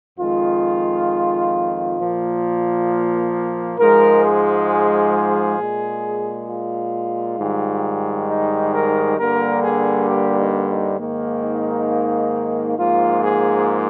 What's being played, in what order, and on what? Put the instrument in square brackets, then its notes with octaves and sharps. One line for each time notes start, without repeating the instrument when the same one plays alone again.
[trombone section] F2 D#3 G#3 F4
A#2 F3 A#3
G#2 F3 G#3 A#4
G#4
A#2 G#3
F4
G#2 D#3 G3
D#4
A#4
G2 D3 G3 A#3 A#4
G#4
G4
D#4
D#4
G#2 D#3 A#3
D#4
G#2 F3 A#3 F4
G#4